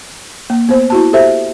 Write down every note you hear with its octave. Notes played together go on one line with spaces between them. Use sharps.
A#3
B3 C5
E4 F#4 A5
G4 A4 C5 E5